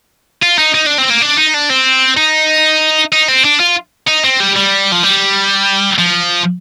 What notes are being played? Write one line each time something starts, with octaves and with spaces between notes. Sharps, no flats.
F4
D#4
D#4
D4
C4
A#3
D4
D#4
D4
C4
D#4
D#4
C4
D4
F4
D#4
C4
G3
G3
F3
G3
F3